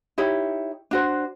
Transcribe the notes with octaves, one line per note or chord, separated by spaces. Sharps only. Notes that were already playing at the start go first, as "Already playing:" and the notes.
D#4 E4 G4 C#5
D4 F#4 C5